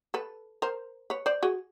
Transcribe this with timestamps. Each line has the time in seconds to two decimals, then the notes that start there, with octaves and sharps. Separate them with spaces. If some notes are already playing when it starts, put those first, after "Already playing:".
0.14 A4 B4
0.62 A#4 C5
1.10 B4 C#5
1.26 C5 D5
1.43 F#4 G#4